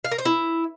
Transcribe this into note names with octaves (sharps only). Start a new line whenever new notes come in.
F5
A#4
C5
E4